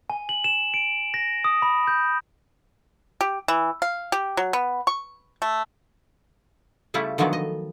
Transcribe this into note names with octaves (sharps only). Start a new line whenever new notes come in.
G#5
F#7
E7
D7
A#6
D#6
B5
G6
G4
E3
F5
G4
F#3
B3
C#6
A3
C#3 G3 A3 E4 F4
D3 D#3 F3 F#3 B3
D#5